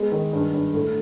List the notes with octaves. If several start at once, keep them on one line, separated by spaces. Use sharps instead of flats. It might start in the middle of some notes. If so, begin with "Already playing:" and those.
Already playing: G#3 B3
D#3
G2
G2
A2